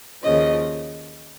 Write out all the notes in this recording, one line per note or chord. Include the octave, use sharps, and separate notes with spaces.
D#2 C#3 F3 D#5